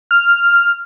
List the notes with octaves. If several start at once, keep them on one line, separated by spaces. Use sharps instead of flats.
F6